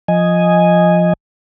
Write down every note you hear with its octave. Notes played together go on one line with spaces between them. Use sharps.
F3 D#5 G#5